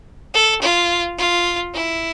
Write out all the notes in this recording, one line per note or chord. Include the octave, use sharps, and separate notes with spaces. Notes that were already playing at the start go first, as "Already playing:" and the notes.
A4
F4
F4
E4